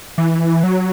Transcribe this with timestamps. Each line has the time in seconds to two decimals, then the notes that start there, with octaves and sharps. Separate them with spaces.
0.18 E3
0.63 F#3